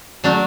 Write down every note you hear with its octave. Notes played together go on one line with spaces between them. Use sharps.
F#3 A3 D4